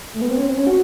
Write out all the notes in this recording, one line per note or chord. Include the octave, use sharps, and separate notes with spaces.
A3
B3
C4
C#4
C4
C#4
F#4